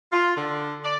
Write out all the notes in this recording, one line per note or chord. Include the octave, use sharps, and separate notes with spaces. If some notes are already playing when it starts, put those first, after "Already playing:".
F4
D3
D5